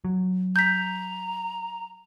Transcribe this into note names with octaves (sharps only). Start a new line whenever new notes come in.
F#3
A#5 G6 B6